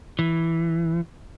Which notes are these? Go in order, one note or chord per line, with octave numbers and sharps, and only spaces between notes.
E3